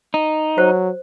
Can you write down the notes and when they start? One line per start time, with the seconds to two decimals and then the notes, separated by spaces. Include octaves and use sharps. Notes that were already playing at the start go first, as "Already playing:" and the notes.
0.14 D#4
0.58 F#3 C5